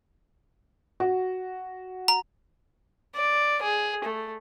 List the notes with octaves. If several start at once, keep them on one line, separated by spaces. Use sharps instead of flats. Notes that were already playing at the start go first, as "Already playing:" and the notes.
F#4
A#5
D5
G#4
A3